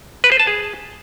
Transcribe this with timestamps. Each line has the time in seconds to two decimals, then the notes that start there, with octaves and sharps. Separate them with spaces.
0.24 B4
0.32 C5
0.39 A5
0.47 G#4